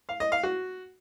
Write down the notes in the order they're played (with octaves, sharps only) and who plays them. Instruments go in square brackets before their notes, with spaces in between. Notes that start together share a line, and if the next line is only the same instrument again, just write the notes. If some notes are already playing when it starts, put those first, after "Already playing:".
[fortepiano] F5
D#5
F5
F#4